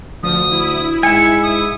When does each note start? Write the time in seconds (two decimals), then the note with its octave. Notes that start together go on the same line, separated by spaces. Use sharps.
0.23 D2 F3 D#6
0.52 E4
1.03 G#2 E5 G#5 C#7
1.43 D#6